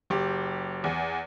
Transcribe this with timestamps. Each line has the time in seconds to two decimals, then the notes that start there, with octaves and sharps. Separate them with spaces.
0.10 F#1 G4
0.84 E2